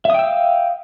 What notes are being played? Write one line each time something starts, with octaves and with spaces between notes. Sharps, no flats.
E5 F5 G5 D#6 E6